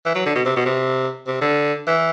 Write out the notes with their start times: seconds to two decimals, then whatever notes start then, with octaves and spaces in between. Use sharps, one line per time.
0.06 E3
0.15 F#3
0.26 D3
0.35 B2
0.45 C3
0.56 B2
0.66 C3
1.27 C3
1.41 D3
1.87 E3